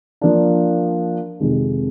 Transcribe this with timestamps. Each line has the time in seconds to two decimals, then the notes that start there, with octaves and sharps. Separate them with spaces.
0.21 F3 A#3 D4
1.40 F2 C3 D#3 G#3